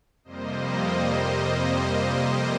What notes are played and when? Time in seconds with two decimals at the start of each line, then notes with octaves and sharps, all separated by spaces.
0.24 F2 C3 G3 A#3 C5 D#5
0.79 C5 D#5